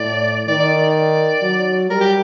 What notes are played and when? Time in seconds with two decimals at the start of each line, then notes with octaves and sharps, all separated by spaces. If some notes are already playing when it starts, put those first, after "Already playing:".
Already playing: A2 D5
0.48 D#3 D5
0.60 D5
0.84 D5
1.42 F#3
1.90 G3 A#4
2.01 G4